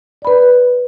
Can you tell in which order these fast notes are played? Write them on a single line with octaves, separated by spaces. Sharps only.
D5 B5 B4